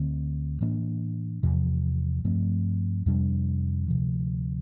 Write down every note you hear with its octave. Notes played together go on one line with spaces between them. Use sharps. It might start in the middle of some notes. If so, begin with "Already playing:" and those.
Already playing: D2 D3 A3 C4
A2 E3 A#3 D4
E2 C3 F3
G2 F3 A3 C4
F2 C3 G3 D4
D2 C3 F3